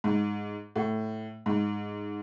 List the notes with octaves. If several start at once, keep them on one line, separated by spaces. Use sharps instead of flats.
G#2
A2
G#2